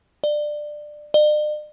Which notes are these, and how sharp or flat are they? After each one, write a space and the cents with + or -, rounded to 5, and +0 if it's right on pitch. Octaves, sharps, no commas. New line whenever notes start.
D5 +20
D5 +45